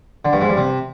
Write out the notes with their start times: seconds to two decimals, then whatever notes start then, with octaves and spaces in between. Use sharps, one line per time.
0.25 D3
0.33 G2
0.41 G#2
0.49 G2
0.58 C3